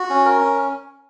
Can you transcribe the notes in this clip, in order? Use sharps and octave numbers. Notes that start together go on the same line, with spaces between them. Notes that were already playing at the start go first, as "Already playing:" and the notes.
Already playing: F#4
C#4
A#4
C#4